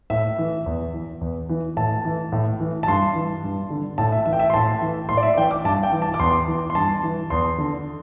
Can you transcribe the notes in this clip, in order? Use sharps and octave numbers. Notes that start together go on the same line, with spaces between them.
A2 E5
E3
E2
E3
E2
E3
A2 A5
E3
A2
E3
A5
G2 C6
E3
G2
D3
A2 A5
E5
E3 E5
G5
E5
C6
A2 A5
E3
A2 C6
D5
E5
E3 G5
D6
G2 A5
G5
E3
A5
D6
E2 C6
E3
C6
G2 A5
E3
E2 C6
D3